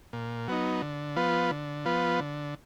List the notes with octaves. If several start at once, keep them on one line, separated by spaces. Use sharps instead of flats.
A#2
F#3 B3 D#4
D3
F3 B3 F4 B4
D3
F3 B3 F4 B4
D3